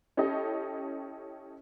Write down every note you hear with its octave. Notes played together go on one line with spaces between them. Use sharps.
C#4 E4 G4 A4 D#5